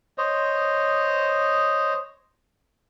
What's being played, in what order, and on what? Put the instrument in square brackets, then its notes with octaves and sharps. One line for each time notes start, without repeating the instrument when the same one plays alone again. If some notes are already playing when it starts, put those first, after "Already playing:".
[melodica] C5 C#5 D#5